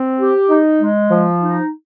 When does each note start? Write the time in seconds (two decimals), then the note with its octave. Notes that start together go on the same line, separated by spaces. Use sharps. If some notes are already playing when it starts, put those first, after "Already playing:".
Already playing: C4
0.20 G4
0.49 D#4
0.80 G#3
1.11 F3
1.41 D#4